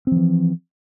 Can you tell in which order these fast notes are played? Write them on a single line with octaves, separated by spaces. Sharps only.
C4 F3 E3